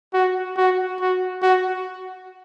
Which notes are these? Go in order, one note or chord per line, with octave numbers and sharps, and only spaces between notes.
F#4
F#4
F#4
F#4